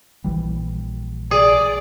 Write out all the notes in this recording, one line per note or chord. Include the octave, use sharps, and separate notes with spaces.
A#1 E3 G3
G#4 D5